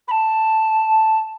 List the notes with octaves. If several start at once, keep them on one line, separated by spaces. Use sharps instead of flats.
B5
A5